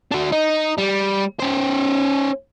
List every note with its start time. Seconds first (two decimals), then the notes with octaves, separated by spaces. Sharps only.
0.11 D4 F#4
0.32 D#4
0.78 G3
1.40 C#4 C5